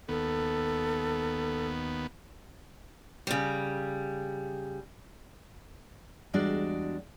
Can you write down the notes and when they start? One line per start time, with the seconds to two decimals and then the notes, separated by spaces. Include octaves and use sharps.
0.08 D#2 B3 A4
3.27 C#3 G3
6.33 E2 G3 G#3 D4 F#4 D5